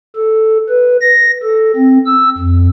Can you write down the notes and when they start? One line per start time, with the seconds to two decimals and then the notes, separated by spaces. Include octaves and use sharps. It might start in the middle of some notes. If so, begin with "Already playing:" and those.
0.16 A4
0.69 B4
1.01 A#6
1.43 A4
1.76 C4
2.06 E6
2.38 F2